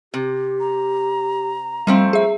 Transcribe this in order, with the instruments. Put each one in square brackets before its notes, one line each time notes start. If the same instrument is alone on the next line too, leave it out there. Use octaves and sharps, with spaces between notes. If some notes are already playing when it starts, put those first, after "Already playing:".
[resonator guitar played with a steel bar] C3 [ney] G4
[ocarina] A#5
[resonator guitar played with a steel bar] F3 A3 C4 [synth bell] G3 [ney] F5
[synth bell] G#4 E5